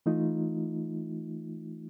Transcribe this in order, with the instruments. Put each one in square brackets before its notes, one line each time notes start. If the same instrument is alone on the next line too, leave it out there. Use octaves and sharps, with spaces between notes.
[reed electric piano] E3 A3 D#4 F4